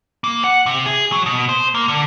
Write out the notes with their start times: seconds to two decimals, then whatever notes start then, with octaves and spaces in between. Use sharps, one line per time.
0.24 A#3
0.44 F#5
0.66 C3
0.86 G#4
1.12 F#3
1.26 B2
1.49 C5
1.75 A#3
1.88 D3